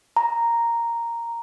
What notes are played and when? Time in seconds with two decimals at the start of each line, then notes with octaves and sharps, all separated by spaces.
0.17 A#5